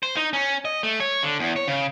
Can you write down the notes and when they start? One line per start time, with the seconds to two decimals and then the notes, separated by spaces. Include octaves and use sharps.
0.03 C5
0.16 D#4
0.33 C#4
0.65 D#5
0.83 A3
1.00 C#5
1.23 D3
1.39 E2
1.56 C#5
1.68 C#3